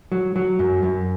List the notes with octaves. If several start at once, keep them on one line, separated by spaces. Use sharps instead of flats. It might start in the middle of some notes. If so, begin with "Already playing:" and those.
F#3
F#3
F#2
F#2